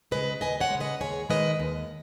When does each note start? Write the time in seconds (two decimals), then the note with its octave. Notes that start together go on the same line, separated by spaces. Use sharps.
0.11 C#3 G#3 B4 D#5
0.41 D#2 D#5 G#5
0.60 C#5 F#5
0.70 C#3 G#3
0.80 B4 D#5
1.00 D#2 G#4 C#5
1.29 D#3 G#3 B4 D#5
1.60 D#2